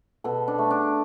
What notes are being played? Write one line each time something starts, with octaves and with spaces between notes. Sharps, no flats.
B2 A4
D4
A3
D4